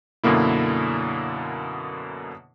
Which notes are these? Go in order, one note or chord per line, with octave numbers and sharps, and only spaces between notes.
F#2 B2 D3 A#3 E4